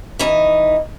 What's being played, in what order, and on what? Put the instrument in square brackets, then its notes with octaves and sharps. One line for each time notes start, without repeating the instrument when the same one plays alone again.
[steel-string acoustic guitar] E3 D#4